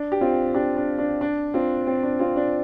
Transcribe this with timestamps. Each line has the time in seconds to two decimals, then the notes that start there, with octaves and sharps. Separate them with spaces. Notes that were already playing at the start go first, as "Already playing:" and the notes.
Already playing: D4
0.12 G4
0.21 C4 F4
0.54 D4 G4
0.77 D4
0.99 D4
1.21 D4
1.54 C4 F4
1.87 C4
2.03 D4
2.19 C4 F4
2.36 D4